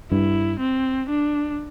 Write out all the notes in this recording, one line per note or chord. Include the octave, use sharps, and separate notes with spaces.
G2 E4
C4
D4